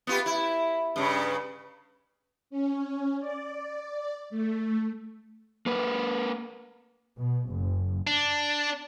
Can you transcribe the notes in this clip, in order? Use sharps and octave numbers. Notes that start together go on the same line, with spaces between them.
B3 F4 G4
E4
G2 C#3
C#4
D5
A3
A#3 B4
B2
F#1
D4